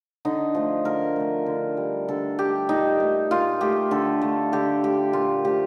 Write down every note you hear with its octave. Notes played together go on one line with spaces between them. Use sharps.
D3 D#4
F3 A3
D3 A#4
F3 A3
D3
G3
D3 A4
G3 G4
A#2 D#4
A3
A#2 F4
A3 G4
D3 A4
A3
D3 G4
A3 G4
A#2 F4
F3 A3 G4